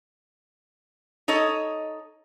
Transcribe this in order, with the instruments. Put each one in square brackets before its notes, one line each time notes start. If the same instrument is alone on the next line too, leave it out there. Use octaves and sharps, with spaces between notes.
[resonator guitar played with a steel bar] D#4 A4 C#5 D#5